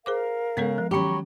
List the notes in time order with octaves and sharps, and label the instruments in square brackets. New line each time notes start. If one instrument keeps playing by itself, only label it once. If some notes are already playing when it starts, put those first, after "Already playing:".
[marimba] G#4 C5 D6 [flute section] A#4 F5
[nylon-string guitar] C#3 [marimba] G#3 B3 A4
[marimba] F3
[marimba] D#3 C#4 [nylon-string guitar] F#3 G4 [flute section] A#5 B5 C#6